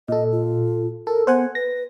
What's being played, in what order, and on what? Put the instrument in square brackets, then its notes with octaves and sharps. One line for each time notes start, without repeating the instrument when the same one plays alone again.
[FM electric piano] A#2 A4 [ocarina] D#5
[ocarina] F4
[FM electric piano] A4 [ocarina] A#4
[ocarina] B3 [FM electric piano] C5 F#5 G#5
[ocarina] B4 [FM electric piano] A#6